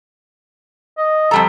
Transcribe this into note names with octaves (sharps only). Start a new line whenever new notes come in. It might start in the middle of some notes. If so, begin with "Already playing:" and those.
D#5
F2 G3 A4 A#5